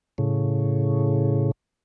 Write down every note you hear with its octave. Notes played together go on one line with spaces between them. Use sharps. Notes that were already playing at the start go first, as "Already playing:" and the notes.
A2 C#3